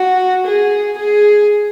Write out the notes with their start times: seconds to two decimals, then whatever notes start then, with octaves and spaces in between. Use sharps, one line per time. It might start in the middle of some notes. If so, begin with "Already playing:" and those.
Already playing: F#4
0.46 G#4
0.98 G#4